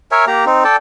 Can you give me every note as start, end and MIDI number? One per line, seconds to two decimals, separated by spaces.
0.11 0.25 70
0.11 0.25 73
0.11 0.25 76
0.11 0.25 80
0.27 0.45 58
0.27 0.45 67
0.27 0.45 82
0.46 0.64 60
0.46 0.64 63
0.64 0.76 69
0.64 0.76 74
0.64 0.76 79
0.64 0.76 81